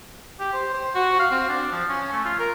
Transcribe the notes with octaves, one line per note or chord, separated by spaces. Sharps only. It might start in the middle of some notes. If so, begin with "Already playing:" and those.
G4
C5
C5
F#4
F5
C4
D4
F3
C#4
A3
F4
A#4